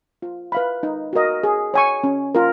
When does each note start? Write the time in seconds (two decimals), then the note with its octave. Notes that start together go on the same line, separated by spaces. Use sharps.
0.22 F4
0.52 B4 F5 B5
0.83 D#4
1.13 F#4 A#4 D#5
1.43 G#4
1.74 C#5 G#5 C#6
2.04 C#4
2.35 F4 A#4